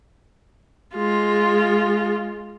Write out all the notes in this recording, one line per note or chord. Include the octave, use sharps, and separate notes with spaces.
G#3 F4